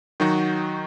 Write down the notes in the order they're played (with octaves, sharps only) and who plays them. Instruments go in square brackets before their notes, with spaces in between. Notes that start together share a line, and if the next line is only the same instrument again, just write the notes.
[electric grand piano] D#3 F#3 D#4 F#4